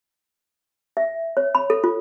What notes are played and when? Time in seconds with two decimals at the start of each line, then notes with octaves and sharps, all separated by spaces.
0.97 E5
1.37 C#5
1.55 B5
1.70 A4
1.84 F4